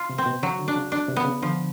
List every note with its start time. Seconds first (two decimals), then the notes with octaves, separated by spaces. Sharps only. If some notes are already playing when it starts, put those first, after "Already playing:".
Already playing: F4
0.09 C3
0.18 C4
0.26 B2
0.42 C#3 F#3
0.59 D3
0.68 D4
0.75 C#3
0.92 D4
1.08 C3
1.16 B3
1.25 C#3
1.42 D3 F3